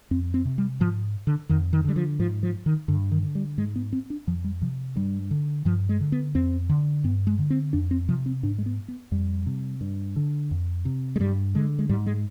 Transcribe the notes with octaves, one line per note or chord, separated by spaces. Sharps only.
F2 C4
C4
C3
G3
G#2 F3
D3
F2 D#3
D#3
D3 G3
F3
G#2 F3
F3
D#3
G2 D3
D#3
D3
G3
G#2 G#3
B3
C4
D4
F2 F3
G3
C3 F3
G2 G3
D3
G2 F3
G#3
D3
B3
F2 C4
D3
G2 B3
G#3
D3
C4
F2 D4
C4
C3 F3
C4
G#2 D4
G#3
B3
B3
F2 G3
C3
G2
D3
F2
C3
G#3
G2 G3
D3 G#3
G#3
G#2 G3
G#3